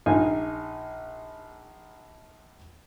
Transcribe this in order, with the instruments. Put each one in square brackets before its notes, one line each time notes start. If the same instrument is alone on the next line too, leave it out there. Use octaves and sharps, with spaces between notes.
[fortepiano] A#1 D#4 F5 G#5